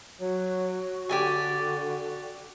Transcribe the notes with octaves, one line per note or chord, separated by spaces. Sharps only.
F#3 F#4
D3 G4 D5 G#5